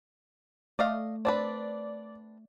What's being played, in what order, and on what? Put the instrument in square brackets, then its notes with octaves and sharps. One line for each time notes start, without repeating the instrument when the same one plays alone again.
[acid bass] A3 [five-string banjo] D5 D#5 F5
[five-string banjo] C4 D4 B4 [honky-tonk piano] D5